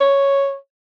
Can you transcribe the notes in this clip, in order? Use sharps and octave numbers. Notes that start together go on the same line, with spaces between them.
C#5